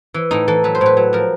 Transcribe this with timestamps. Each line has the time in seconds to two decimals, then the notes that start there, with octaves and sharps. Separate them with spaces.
0.14 E3
0.31 A2 D#4
0.48 E3 A4
0.64 F#3 B4
0.75 C5
0.81 A2 B4
0.97 F#3
1.13 F3 A#4